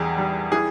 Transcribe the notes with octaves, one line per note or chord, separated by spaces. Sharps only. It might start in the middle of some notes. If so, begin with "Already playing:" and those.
Already playing: E2 G3 G4 G#4 A#4
G3
E3 G#4